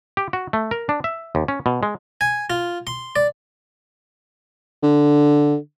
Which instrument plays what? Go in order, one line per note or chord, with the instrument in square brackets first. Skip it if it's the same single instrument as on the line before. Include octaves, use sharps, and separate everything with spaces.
[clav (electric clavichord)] G4
F#4
A3
A#4
D4
E5
D#2
C#4
B2
G#3
[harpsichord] G#5
F4
C6
D5
[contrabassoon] D3